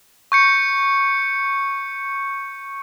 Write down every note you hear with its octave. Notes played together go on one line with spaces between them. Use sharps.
C#6 G6 C#7